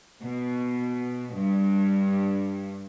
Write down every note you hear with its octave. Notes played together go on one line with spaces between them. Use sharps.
B2
G2